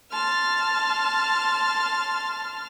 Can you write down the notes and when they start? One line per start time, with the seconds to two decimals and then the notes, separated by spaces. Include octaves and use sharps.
0.12 A5 C6 F6